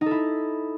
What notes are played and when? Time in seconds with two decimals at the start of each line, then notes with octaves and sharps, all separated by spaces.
0.01 D#4
0.06 A4
0.11 E4